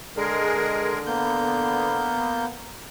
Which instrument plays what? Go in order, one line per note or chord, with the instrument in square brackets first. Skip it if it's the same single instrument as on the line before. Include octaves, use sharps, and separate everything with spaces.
[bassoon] D3 [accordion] G#3 G#4 A#4
[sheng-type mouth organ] A#3 G6 [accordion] B3